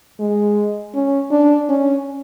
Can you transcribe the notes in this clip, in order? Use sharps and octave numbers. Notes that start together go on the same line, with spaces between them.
G#3
C#4
D4
C#4